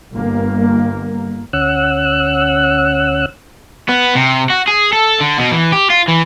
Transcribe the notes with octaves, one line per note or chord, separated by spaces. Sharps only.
G1 A#3
D2 C#4 F#5 E6 F#6
B3
C3
F#4
G#4
A4
D3
B2
E3
G4
F4
E3